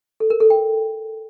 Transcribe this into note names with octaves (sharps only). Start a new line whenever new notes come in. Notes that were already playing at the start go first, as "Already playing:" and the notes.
A4
A#4
A4
G5